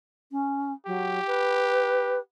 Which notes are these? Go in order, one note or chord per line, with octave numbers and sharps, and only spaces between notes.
C#4
F#3 G4
B4